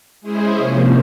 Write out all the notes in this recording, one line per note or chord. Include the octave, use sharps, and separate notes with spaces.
G#3 C#4 E4 G#4 C5
C3 F3 A#3 C#4